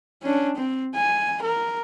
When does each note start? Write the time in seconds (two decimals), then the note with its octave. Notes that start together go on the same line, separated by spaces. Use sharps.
0.23 C#4 D4
0.56 C4
0.95 G#5
1.42 A#4